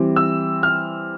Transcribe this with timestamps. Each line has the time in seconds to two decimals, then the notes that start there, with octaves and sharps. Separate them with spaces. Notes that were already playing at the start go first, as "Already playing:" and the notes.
Already playing: E3 G3 C4
0.16 E6
0.63 F6